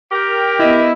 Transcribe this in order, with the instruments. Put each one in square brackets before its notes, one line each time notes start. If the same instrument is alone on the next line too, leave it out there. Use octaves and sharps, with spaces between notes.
[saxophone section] G4 A#4
[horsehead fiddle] B3 D#5 [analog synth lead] E4